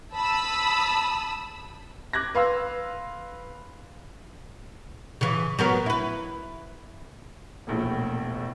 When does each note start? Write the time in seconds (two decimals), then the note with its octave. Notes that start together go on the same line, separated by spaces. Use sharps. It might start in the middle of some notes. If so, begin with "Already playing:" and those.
0.15 A5 B5 D#6 E6
2.13 D6 F#6 G#6 A#6
2.35 B4 F5 C6 E6
5.21 C#3 E3
5.59 F#3 B3 A#4
5.86 E4 B4
7.67 E1 A#1 A2